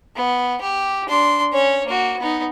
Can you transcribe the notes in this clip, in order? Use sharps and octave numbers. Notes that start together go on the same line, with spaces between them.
B3
G4
D4 C6
C#4 C#5
A#3 F#4
B3 D#4